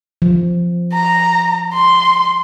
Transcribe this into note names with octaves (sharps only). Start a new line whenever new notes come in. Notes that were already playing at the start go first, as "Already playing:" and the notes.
F3
A#5
C6